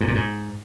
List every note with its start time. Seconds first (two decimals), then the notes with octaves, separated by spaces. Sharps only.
0.01 G#2
0.08 A#2
0.15 G#2